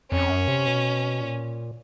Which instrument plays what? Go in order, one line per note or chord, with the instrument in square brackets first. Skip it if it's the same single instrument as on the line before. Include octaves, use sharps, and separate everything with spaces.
[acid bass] F2 [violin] C#4
[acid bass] F#2
C3
B2
A#2